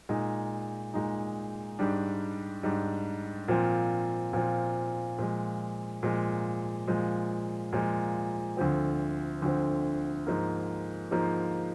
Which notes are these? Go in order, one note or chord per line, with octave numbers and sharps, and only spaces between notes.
A#2 G#3 D#4
A#2 G#3 D#4
G#2 G3 D4
G#2 G3 D4
A#2 F3 C4 F4
A#2 F3 C4 F4
A#2 F3 G#3
A#2 F3 G#3
A#2 F3 G#3
A#2 F3 G#3
D2 D3 F3 C4
D2 D3 F3 C4
G#2 F3 A#3
G#2 F3 A#3